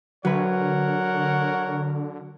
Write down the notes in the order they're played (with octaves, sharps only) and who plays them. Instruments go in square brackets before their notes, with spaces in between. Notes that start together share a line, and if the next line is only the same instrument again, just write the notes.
[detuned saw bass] D3 [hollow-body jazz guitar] F#3 B4 [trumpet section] A#4 C#5 F#5